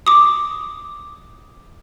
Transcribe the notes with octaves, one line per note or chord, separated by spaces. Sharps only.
D6 D#6